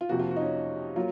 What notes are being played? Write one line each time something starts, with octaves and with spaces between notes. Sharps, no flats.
F4
F2 C3 F3 A#3 F#4
F4
F#4
D#4
C#4
F#3 A#3 F4